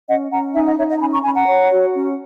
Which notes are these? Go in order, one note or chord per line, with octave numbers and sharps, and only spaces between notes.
C#4 D#5 F#5
C#4 F#5 A#5
D#4 E5 G#5
D#5 F#5
D#4 C#5 E5
D#5 F#5
A#5
C#4 G#5 B5
A#5 C#6
C#4 G#5 B5
F#5 A#5
C#5
F#4
C#4